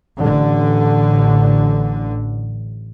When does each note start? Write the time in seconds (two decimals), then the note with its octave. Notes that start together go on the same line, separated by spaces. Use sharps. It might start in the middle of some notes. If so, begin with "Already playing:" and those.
0.20 A1 D3